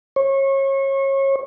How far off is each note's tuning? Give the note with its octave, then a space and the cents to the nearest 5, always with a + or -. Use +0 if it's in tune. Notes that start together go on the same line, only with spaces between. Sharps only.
C#5 -30